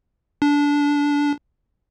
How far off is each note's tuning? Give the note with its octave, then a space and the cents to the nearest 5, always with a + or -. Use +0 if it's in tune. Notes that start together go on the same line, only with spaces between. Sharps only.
D4 -20